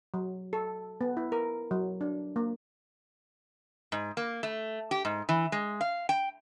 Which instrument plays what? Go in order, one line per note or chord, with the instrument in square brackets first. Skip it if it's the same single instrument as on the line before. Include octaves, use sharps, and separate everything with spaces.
[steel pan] F#3
A4
B3
E4
A#4
F#3
D4
A#3
[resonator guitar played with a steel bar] G#2
A#3
A3
G4
G#2
E3
G#3
F5
G5